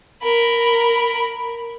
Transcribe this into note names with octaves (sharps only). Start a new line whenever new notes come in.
A#4 B5